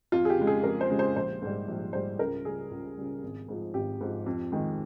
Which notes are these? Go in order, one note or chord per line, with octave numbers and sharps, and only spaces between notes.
F2 F4
G#4
G4
C#3 G#3
G#4
F2 A#4
C5
C#3 G#3
C5
A#1 C5
G#2 G3
A#1
G#2 G3 C5
C#2 A#4
C#3 G3 G#4
C#2
C#3 G3
G#1
G#2 F3
G#1 G4
G#2 F3
F2
D#3 G#3